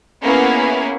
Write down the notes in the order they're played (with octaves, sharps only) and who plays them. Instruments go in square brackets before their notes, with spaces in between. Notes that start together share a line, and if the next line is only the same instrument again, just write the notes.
[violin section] A#3 B3 C#4 E4 G#4